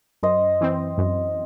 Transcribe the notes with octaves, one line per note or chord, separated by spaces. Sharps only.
F#2 C5 D#5
E3 C4
F#2